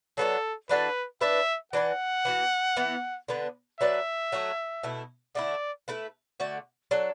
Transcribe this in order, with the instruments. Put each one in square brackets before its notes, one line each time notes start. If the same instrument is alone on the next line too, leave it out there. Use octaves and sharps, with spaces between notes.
[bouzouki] F#3 B3 D4 F#4 [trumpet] A4
[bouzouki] E3 D4 F#4 A4 [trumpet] B4
[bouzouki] E3 D4 B4 D5 [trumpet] E5
[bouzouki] E3 D4 B4 [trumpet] F#5
[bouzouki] E3 B3 F#4
E3 B3 E4
D3 B3 D4 B4
[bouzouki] F#3 D4 B4 D5 [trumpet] E5
[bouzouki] F#3 A3 F#4
B2 A3 E4
[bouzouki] D3 A3 E4 [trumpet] D5
[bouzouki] A3 E4 B4
D3 A3 F#4 D5
F#3 D4 A4